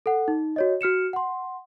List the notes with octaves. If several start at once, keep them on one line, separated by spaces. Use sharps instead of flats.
A4 F#5
D#4
F#4 C#5 D#5
F#4 F6 C#7 E7
F#5 C6